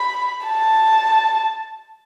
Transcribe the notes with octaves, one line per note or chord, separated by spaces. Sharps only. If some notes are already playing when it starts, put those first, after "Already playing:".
Already playing: B5
A5